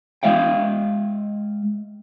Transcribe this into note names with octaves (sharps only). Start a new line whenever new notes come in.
G#3 E5 F5 G5